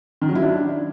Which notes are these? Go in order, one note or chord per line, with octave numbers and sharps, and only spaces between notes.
D#3
F#3
E4
D4